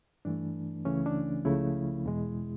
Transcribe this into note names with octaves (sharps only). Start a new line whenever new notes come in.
G2 E3 A3 D4
C#2 C#3 E3 A3 C#4
D4
C#2 C#3 F3 A3 E4
E2 B2 G#3